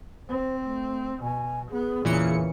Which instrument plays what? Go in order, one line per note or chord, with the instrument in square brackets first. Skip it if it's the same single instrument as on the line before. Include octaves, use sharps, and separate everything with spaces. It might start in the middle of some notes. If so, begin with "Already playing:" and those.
[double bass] C4 [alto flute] C5
[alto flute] A3
[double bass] B2 [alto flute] G#5
[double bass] B3 [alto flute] G#4
[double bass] E2 C#3 [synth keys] A#2 E3 C#7